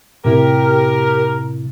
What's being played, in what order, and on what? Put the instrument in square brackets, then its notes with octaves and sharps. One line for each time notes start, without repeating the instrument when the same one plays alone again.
[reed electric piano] A2 C3 E4 [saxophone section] G4 A#4